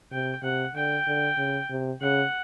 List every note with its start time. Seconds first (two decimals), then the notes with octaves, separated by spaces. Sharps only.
0.11 C3 G5
0.43 C3 F#5
0.75 D3 G5
1.07 D3
1.38 C#3
1.70 C3
2.01 C#3 F#5